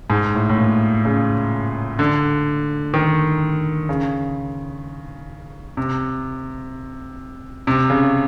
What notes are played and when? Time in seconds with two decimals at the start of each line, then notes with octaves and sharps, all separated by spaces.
0.10 G#2
0.34 A2
0.49 A2
0.58 A#2
1.05 C#3
1.99 D3
2.94 D#3
3.89 C#3
5.77 C3
7.67 C3
7.90 C#3